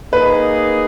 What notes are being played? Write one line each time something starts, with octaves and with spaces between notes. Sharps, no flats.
A#3 D#4 G#4 B4